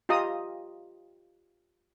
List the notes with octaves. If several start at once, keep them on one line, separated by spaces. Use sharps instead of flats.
F4 G4 D#5 A#5 D#6